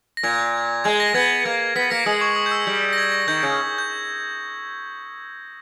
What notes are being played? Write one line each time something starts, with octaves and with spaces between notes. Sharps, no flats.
A#6
A#2 G#6
G#3 G#6
A#6
B3 G#6
A#3
B3 B6
A#3 A#6 C#7
G#3 D#6
C#6
D#6
G6
E6
G3
A#6
G#6
A#6
D#3 G6
C#3
G6